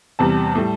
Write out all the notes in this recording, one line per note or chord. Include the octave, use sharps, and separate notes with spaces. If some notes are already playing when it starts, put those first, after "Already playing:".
E2 C3 G3 A5
A2 G3